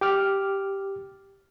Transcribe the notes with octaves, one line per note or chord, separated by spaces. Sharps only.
G4 D6 F6